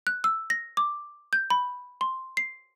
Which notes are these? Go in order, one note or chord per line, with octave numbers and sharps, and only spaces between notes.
F#6
E6
A#6
D6
G6
B5
C6
C7